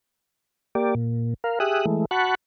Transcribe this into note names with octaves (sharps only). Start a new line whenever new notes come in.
A#3 G4 D5
A#2
A#4 F5
G4 G#4 E5 D#6 F#6
E3 G#3 A3
F#4 F#5 A5 B5 C#6 F#6